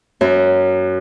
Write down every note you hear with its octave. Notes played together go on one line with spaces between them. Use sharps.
F#2